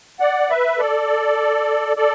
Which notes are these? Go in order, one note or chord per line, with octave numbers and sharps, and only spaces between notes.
D5 F#5
B4 E5
A4 D5
A4 D5